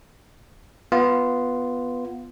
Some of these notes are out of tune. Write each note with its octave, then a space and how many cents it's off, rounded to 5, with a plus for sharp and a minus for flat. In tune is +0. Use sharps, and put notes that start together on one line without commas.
B3 +0 F4 -10